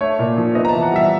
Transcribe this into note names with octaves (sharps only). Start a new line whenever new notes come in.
A3 C#5
A#2
F3
B3 D#5
A#5
A5
E3
F#5
G3 E5